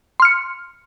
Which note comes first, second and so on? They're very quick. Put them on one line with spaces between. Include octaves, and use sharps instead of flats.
C6 F6 C#7